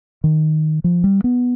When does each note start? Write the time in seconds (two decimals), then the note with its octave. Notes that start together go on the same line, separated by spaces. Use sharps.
0.24 D#3
0.84 F3
1.04 G3
1.24 B3